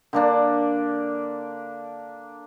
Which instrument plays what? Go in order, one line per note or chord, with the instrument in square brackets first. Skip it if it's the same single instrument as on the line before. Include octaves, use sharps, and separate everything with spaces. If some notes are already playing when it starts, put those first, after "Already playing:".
[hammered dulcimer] D3 A#3 D4